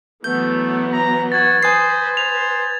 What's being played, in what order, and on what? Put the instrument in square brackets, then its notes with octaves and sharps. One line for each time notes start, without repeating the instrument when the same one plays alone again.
[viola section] E3 F#3 B3 [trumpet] A3 [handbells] G6
[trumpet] A#5
[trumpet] F#4 [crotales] G#6 A6
[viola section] B4 [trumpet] C5 [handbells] G#5 D#6 C7
[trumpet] C5 [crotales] F7